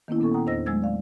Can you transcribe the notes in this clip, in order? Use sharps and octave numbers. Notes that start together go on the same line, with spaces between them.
D#3 A#3 B3 C#4 E4
A#2 B3 C#4 A4 C#6
F#5 G5 A#5 D#6
E2 D4 C5 D#5 E6 A#6
F#3 G#3 A3 E6 G#6 A6
D5 F5